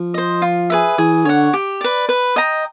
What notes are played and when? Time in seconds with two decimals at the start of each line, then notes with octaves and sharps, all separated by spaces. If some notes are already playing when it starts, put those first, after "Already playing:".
Already playing: F3
0.14 C5 D#5
0.42 F4
0.70 G#4 B4 E5
0.98 E3 G#4
1.25 D3 C#5 F#5
1.53 G4
1.81 B4 D5
2.09 B4
2.36 D#5 G5 A#5